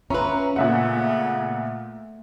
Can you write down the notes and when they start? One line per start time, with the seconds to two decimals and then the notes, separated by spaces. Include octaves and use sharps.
0.10 C#4 F4 B4 E5 A#5
0.56 A#2 C#3 A3 B3 E5 F#5